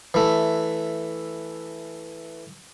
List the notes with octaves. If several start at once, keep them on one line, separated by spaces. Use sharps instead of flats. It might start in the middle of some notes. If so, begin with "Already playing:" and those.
E3 A3